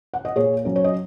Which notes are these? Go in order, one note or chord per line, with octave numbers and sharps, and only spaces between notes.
F#5
D#5
A#2 G#4 C#5
F#3 C#4
C#5
D#5